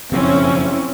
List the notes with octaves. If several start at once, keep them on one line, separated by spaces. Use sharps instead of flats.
F#1 B1 F2 C4 C#4 E4